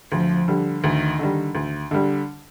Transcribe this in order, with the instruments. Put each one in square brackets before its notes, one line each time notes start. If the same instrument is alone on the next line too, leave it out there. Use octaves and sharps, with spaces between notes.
[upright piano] D2 [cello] F3
[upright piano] D3 G3
[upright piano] D2 [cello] D#3
[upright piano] D3 G3
D2
D3 G3